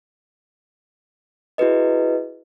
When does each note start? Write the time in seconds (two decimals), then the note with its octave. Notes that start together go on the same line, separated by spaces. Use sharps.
1.58 E4 F#4 G#4 B4 D#5